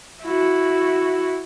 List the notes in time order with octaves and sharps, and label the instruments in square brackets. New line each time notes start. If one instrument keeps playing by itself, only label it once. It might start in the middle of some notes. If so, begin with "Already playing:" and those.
[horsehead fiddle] E4 F#4